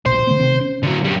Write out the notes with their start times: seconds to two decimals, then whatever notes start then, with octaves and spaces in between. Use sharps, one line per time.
0.06 D1 A#1 B2 C5
0.27 D3 A3 B3
0.40 C3 D#3 C4
0.61 C#4
0.83 D3 F#3
1.04 F#2 G3